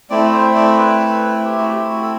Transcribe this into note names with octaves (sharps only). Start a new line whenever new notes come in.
A3 C4 E4 D5
C5
D5
B4
G4
F#4
G4
F#4
A4